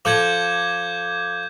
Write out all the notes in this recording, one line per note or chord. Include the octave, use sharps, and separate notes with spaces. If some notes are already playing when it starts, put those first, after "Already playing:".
F3 A4 D6 G6 G#6